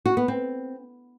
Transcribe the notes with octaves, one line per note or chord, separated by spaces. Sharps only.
F#4
B3
C4